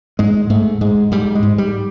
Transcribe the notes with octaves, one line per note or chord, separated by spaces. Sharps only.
G#2 G#3
G#2 A3
G#2 G#3
G#2 G3
G#3
G#2
G3